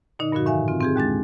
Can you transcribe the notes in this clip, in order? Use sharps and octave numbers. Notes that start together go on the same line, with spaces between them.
A#2 D3 D#4 D#5
G2 A#2 D3 F3 F#4
A2 D#3 E5 F5 G#5
C4 F4
C4 G4 G#4
D#2 G#3 D4 A6